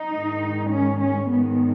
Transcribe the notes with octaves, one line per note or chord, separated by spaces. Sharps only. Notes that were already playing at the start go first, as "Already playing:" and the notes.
Already playing: D#4
G#2 D#3 G#3
C#4
C#4
G#2 D#3 G#3 B3